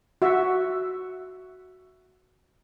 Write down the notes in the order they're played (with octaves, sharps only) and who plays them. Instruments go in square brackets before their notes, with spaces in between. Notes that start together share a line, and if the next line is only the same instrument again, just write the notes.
[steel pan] F#4 E5